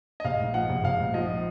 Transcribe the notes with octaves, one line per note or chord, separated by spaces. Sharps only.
D#5
A#1 F5
G#2
F3 F#5
A#1
A#1 F5
G#2
F3 D#5